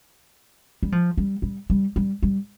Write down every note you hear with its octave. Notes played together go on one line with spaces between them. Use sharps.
G3
F3
G3
G3
G3
G3
G3